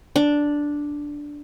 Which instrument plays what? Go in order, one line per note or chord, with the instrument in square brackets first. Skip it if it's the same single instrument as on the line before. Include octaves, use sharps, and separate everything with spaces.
[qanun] D4